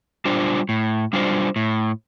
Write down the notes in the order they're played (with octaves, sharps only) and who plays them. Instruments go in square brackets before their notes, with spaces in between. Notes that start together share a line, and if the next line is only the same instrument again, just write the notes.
[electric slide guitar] G3 D4 F4 C5
A2
G3 D4 F4 C5
A2